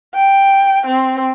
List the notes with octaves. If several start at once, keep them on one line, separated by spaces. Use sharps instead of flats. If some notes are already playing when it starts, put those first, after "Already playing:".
G5
C4